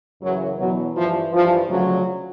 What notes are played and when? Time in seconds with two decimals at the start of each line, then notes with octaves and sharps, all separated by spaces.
0.21 F#2 C#3 E3 F#3
0.58 E2 B2 F#3
0.94 G2 E3 F3
1.32 G2 E3 F3
1.69 D2 C#3 F3 F#3